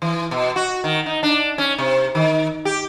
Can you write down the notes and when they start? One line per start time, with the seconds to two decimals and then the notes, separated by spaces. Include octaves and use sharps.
0.02 E3
0.31 B2
0.56 F#4
0.84 D#3
1.06 D#4
1.23 D4
1.58 C#4
1.78 C3
2.15 D#3
2.65 G4